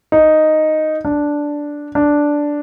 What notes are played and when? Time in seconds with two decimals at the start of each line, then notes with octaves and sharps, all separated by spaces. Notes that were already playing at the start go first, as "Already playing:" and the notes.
0.12 D#4
1.05 D4
1.95 D4